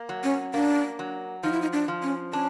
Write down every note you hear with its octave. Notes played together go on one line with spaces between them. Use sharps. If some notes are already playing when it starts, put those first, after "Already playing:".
Already playing: A#3
F#3
C#4
A#3 D4
F#3
F3 D#4
E4
D#4
D4
F3
C#4
C#4 D4